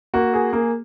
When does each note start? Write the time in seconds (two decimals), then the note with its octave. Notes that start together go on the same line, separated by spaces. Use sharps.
0.14 A#3 F#4
0.34 G#4
0.53 A#3